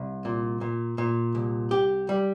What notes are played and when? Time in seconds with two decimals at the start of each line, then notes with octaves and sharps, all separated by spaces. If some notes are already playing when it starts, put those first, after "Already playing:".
Already playing: C2
0.25 A#2
0.61 A#2
0.98 A#2
1.35 C2
1.71 G4
2.09 G3